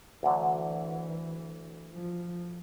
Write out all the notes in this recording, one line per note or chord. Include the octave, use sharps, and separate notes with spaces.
D2 D3 E3 F#3
F3